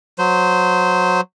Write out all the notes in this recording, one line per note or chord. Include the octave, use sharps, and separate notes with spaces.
F#3 C5